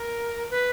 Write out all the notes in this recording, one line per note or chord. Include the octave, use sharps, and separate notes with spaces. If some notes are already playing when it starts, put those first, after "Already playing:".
Already playing: A#4
B4